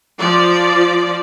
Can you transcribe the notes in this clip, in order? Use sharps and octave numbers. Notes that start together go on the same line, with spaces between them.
F3 D5